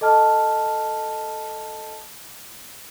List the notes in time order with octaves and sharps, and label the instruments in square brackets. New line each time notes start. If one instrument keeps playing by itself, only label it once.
[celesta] A4 D#5 A5 F6